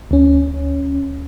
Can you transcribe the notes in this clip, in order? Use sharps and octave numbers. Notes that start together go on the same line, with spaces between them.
D2 C#4